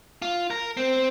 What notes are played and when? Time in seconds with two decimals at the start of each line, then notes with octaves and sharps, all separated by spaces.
0.22 F4
0.50 A#4
0.77 C4